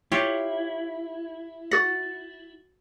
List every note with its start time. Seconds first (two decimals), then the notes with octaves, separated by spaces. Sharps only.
0.12 E4 F4 G4 C#5
1.71 F#4 F#5 A6